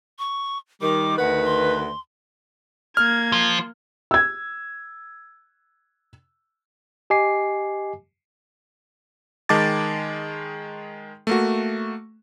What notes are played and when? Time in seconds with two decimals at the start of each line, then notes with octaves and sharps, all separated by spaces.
0.19 C#6
0.81 D#3 G3 D6
1.18 D2 D#3 B4 F#5
1.45 C6
2.97 A#3 F6 G#6
3.32 F3
4.11 E6 G#6
7.10 G4 D#5 G#5 D6 C7
9.49 D#3 G#3 A5 D6 A6
11.27 A3 A#3 F#4